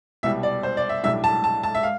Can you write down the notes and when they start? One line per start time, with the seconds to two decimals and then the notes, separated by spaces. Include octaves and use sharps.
0.23 C2 B2 G3 E5
0.43 D5
0.63 C5
0.77 D5
0.89 E5
1.03 B1 A2 G3 D4 E5
1.24 A5
1.44 A5
1.63 A5
1.75 E5
1.83 F5